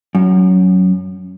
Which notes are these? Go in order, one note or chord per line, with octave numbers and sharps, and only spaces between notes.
F#2